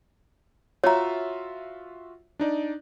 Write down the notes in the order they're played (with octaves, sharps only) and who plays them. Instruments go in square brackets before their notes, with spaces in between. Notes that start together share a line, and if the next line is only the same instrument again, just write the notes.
[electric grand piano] F4 F#4 E5 [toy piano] C#5 A#5
[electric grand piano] D4 D#4 D5